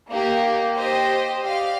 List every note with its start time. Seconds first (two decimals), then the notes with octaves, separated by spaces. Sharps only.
0.10 A#3 D#4 G4
0.75 G4 C5 D#5
1.42 G4 D5 F5